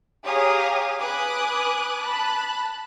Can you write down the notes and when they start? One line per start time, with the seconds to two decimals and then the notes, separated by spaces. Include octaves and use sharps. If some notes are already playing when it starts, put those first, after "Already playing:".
0.25 G4 G#4 C#5 F5 A#5 D#6
0.98 B4 G#5 D6 D#6 F#6
2.01 A5 B5 F#6